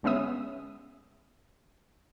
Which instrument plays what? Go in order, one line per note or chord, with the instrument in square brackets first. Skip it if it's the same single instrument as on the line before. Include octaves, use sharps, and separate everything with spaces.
[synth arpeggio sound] G1 G#3 B3 C#4 E5 D#6